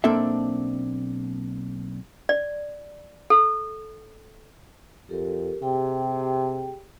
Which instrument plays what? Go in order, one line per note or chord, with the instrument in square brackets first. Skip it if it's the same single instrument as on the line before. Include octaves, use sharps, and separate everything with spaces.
[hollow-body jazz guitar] B1 A#3 C4 D4 A4 E5
[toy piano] D5
A4
[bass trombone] F2 [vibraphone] G4 A4 A#4
[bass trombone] C3 [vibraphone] G4 G#4 G5